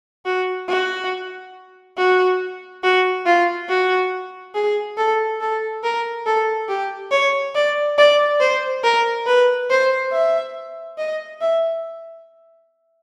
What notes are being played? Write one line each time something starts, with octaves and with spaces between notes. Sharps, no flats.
F#4
F#4
F#4
F#4
F4
F#4
G#4
A4
A4
A#4
A4
G4
C#5
D5
D5
C5
A#4
B4
C5
E5
D#5
E5